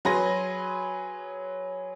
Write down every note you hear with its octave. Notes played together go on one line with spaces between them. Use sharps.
F#3 G#4 B4 C6 A#6